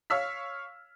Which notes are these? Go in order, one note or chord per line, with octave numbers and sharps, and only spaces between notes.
C#5 F5 C#6 E6 F6 B6